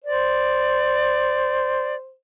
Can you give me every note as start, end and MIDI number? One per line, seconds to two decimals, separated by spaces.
0.04 2.13 72
0.04 1.95 74